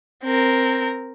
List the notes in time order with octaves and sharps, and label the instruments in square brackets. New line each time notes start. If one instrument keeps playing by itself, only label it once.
[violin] C4 A#4